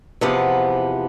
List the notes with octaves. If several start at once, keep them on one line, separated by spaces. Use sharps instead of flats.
E2 C3 F3 B3